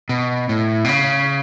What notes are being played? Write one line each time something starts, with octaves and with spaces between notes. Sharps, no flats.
B2
A2
B2
C#3